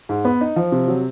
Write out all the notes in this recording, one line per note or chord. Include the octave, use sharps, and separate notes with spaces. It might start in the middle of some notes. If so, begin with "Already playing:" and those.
G#2
B3
D#4
F3
C3
F#3